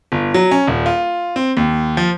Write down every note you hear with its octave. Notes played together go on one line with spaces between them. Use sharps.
G1
F#3
C#4
D#1
F4
C4
D#2
F3